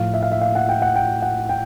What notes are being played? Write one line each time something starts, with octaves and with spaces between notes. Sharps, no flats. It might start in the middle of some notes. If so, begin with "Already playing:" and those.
Already playing: A2 F3 F5
E5
F5
E5
F5
F#5
G5
F#5
G5
F#5
G5